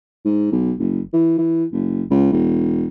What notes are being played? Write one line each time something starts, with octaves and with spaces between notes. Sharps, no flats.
G#2
B1
F#1
E3
E3
F#1
C#2
E1